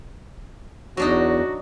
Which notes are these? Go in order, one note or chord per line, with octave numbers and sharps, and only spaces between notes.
E2 F#3 D4 D#4 F#4